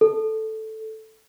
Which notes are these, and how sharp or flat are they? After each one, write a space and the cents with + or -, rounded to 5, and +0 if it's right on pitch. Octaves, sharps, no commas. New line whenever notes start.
A4 -5